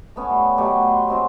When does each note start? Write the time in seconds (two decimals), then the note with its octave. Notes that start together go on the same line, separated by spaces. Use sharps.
0.16 A3 B3 C#4
0.30 G3
0.58 B2 F#3 A3 G4
0.86 C6
1.08 G#3 C4 F#4